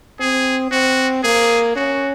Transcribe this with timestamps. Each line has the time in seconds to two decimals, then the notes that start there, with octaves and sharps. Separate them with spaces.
0.20 C4 G#4
0.71 C4 F#4
1.24 A#3 G#4
1.76 C#4 F#4